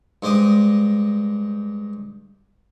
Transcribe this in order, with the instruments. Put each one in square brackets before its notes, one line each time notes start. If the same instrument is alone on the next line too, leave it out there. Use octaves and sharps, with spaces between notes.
[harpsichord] G2 G#3 C5 D6 D#6